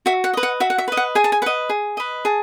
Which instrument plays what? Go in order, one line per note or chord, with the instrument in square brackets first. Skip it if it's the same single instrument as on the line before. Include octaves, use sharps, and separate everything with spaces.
[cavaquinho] F#4 E5
F#5
B4 D#5
F#5
F#4 E5
F#5
E5
B4 D#5
F#5
G#4 G#5
A5
G#5
B4 F#5
D#5
G#4
B4 D#5
G#4 A5